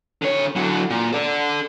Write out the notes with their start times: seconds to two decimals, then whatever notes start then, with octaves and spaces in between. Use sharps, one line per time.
0.22 D3 C#5
0.56 D3 F#3
0.90 A#2
1.13 A4 D5